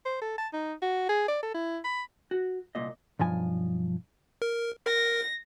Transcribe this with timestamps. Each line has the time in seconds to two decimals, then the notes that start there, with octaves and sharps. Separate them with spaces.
0.06 C5
0.22 A4
0.38 A5
0.53 D#4
0.82 F#4
1.09 G#4
1.28 D5
1.43 A4
1.55 E4
1.84 B5
2.31 F#4
2.75 C2 A#2 D#5
3.19 B1 G2 F3 G#5
4.42 A#4
4.86 A#4 A#6